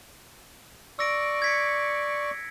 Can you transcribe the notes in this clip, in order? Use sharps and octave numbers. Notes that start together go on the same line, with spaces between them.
D5 C#6 E6 A#6 D7
G#6 B6 C#7